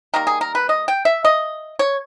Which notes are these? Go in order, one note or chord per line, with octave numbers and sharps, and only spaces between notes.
D#3 G3 A#3 A#4
G#4
A#4
B4
D#5
G5
E5
D#5
C#5